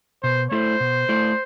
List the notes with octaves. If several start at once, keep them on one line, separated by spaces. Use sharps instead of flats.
B2 C5
A3 E4 A4 C5 D5
B2
A3 E4 A4 D5